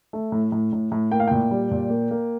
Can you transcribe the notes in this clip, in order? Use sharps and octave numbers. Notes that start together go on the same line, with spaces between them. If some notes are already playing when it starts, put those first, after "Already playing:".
A3
A2
A2
A2
A2
A#3 G5
F5
A#2 G5
G3
A#2
A#3
A#3